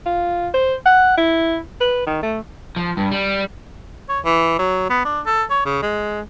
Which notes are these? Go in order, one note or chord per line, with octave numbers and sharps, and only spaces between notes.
F4
C5
F#5
E4
B4
D#3
A3
F3
G2
G3
C#5
E3
F#3
B3
D4
A4
C#5
C#3
G#3